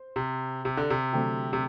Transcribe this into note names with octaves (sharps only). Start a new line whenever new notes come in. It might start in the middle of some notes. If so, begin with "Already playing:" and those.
Already playing: C5
C3
C3
D3
C3
D3 F#3 A3 C4 G4
C3